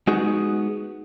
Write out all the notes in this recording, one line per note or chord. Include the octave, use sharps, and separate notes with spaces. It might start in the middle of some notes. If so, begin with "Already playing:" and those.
G#3 B3 D#4 F#4 G#4